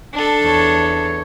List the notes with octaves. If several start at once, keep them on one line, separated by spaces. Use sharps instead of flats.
D4 A4
E2 C#5